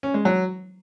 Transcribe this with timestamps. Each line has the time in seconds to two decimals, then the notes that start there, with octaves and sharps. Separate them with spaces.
0.03 C#4
0.14 G#3
0.25 F#3